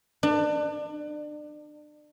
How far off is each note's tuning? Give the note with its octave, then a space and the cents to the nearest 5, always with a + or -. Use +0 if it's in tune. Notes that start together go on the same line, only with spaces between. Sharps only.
D4 +30